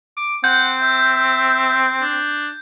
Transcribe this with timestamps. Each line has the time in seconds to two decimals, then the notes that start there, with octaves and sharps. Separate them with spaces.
0.17 D6
0.44 C4 F#5 G6
0.82 E5
2.01 D4